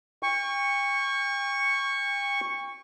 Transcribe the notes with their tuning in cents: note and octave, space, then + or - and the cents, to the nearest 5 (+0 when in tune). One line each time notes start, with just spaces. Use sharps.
G5 +40 C#6 +0